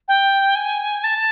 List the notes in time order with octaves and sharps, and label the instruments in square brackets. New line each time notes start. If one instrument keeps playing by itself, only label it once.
[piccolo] G5
G#5
A5